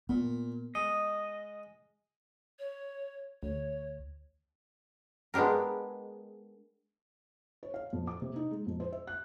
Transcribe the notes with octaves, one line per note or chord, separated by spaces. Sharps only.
A#2 B3
G#3 D#5
C#5
D2 C#5
G#3 B3 D4 G4 A#4
C#5
F5
F2
D6
C3
D#4
G#3
F2
C5
E5
F#6